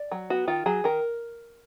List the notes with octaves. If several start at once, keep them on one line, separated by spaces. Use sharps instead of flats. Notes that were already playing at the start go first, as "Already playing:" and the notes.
Already playing: D5
F#3
B3 F#4
D#3 F4
F#3 G#4
D#3 A#4